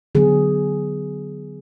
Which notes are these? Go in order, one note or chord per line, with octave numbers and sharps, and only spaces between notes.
D3 F#3 B3 G#4